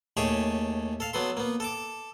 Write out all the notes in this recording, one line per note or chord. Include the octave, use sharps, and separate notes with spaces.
D#2 A3 G4 G#4 C#5 A5
A4 F5
F#3 B3 A4 C6
A#3 B3
A4 A5 D6